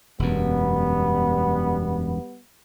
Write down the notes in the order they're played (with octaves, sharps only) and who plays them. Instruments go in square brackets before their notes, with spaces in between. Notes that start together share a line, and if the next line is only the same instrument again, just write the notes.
[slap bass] E1 F#2 [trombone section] G3 B3